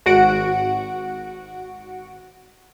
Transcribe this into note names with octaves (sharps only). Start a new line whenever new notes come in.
G#1 F#4 F#5 D7